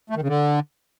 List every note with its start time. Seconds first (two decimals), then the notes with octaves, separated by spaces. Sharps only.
0.10 A3
0.16 D#3
0.22 C#3
0.28 D3